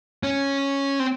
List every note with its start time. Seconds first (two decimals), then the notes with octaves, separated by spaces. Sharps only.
0.23 C#4
1.00 C4